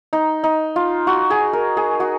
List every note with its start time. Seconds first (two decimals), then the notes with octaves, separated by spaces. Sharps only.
0.13 D#4
0.44 D#4
0.76 F4
1.07 F#4
1.30 G#4
1.53 A#4
1.77 G#4
2.00 F#4